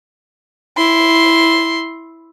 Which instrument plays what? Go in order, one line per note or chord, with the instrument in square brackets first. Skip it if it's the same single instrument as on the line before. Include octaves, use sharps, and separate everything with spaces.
[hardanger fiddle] E4 C6